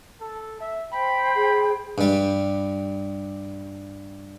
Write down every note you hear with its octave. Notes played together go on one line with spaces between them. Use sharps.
A4
E5
C5 G5 B5
G#4
G2 G3